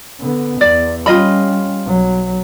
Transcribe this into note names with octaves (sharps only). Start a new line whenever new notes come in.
D3 B3
E2 D5
G3 C#4 F4 D#5 B5
B1 F#3